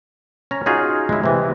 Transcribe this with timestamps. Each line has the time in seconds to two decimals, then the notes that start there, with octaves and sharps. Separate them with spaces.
0.51 C#4 A#5
0.66 C#4 D#4 F4 F#4 G#4
1.09 G#3 E4
1.24 C3 E3